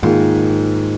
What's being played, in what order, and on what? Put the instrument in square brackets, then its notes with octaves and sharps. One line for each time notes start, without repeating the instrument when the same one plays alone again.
[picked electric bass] G#2 [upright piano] D#3 A#3 F4 G#4